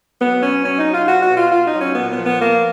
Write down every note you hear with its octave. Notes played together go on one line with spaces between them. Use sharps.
F#3 B3
B2 C#4
F#3 C#4
D#4
F#3
F4
B2 F#4
F#4
B2
F4
B2 F4
D#4
F#3
C#4
A#2 B3
B3
F3
B3
F3 A#3